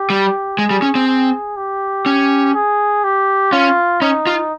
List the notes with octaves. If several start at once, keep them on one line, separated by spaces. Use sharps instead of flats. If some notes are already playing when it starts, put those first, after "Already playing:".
Already playing: G4
G3
G#3 G#4
G3
C#4
C4
G#4
G4
C#4
G#4
G4
C#4 F4
C#4 D#4
F4